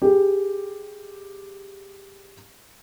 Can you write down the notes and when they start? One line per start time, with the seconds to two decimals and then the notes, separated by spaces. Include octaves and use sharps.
0.02 G4 G#4